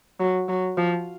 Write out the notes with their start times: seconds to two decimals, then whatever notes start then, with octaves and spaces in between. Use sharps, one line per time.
0.20 F#3
0.48 F#3
0.78 F3